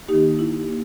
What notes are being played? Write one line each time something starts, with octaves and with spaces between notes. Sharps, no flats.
D#3 A#3 D#4 G4
E4
A#3